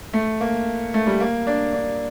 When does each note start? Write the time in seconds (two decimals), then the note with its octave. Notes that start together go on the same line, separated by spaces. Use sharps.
0.13 A3
0.41 A#3
0.94 A3
1.07 G3
1.20 A#3
1.47 D4
1.73 D4